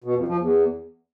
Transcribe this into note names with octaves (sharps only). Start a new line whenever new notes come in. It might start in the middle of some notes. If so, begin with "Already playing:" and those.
B2
F2
F3
E2